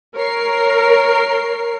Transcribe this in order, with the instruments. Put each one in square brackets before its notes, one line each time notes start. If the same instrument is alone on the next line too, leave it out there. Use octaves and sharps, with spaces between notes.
[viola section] A#4 [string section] C#5 C7